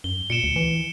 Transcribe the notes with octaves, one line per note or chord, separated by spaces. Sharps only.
F#2 G7
A#2 C#7 D7 E7
D2
E3 E7